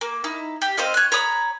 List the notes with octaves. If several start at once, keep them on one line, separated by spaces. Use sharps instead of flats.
A#3
D#4 E4
G4
C4 C5 D#5 F5
C#5 F#6
C#5 A#5 B5 D#6